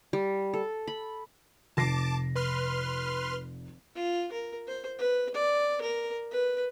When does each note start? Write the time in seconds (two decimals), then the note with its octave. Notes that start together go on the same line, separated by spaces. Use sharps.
0.13 G3
0.54 A4
0.87 B5
1.77 F1 A5 D6 A#6 C7
2.36 B4 C6 F6
3.96 F4
4.32 A#4
4.67 C5
4.99 B4
5.35 D5
5.81 A#4
6.31 B4